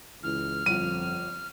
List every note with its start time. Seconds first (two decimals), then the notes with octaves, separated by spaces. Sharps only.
0.23 C#2 E3 F6
0.66 G1 F2 F3 D#7